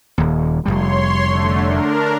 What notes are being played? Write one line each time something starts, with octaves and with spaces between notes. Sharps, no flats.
D#1 D#2
F1 C2 G3 C#5 C6
D3 A3
D4 A#4